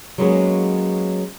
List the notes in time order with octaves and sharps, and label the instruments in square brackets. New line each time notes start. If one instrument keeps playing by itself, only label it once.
[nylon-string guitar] F#3 G#3 A#3 B3 C#4 G#4